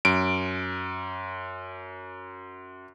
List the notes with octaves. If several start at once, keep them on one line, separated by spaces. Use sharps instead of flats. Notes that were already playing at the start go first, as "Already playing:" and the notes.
F#2 D7